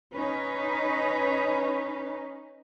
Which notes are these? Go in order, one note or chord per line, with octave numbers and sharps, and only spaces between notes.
C#4 D#4 B4